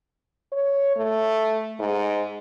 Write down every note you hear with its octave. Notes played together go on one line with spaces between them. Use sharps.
C#5
A3
G#2